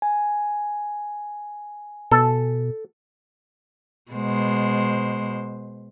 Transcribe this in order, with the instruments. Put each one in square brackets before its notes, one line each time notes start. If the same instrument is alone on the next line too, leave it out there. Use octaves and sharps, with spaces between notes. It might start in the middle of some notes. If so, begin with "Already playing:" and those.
[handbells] G#5
[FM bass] B2 [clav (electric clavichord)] A4
[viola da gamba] B2 G#3 C5